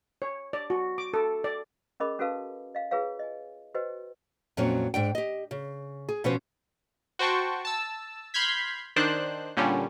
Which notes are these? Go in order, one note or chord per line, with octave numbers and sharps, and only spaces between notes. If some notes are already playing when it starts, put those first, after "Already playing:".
C#5
D5
F#4
D6
A4
D5
C#4 G#4 A#4 D#5 B5 D6
C#4 F#4 A4 B4 F5 A5
D#5 F5
F4 G#4 B4 C#5 F5
D#5 G#5
F#4 B4 C5 D#5 G5
F2 A#2 F#3 C4 C#4
G#2 D4 G5
G4 D#5
C#3
G#4
B2 F3 C#4 B4 C5
F#4 C5 G5 A5 C#6
A5 E6
B5 C6 F6 G6 G#6 B6
D#3 D4 C5 F#6
A#2 D3 G3 C#4